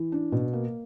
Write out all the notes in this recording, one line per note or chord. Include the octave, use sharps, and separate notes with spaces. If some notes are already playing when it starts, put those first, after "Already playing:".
Already playing: E3
D4
B2
A#3